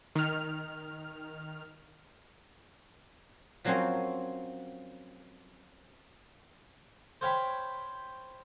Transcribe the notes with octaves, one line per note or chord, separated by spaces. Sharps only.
D#3 F6
F3 F#3 A#3 C4 C#4 C5
C5 C#5 F5 G5 B5 C6